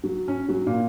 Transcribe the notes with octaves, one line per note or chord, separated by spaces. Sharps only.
F#3
C#4
F#3
A#2